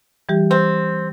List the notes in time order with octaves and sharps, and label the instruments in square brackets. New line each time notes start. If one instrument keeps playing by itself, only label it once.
[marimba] E3 G3 G4
[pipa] C4